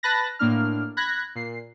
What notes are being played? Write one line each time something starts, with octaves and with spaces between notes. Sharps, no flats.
B4 A5 B5 F#6 A6 A#6
A2 A#3 D4 F6
B5 F#6 G#6 A#6
A#2 C7